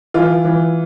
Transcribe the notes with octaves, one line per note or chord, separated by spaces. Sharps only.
E3 F4
E3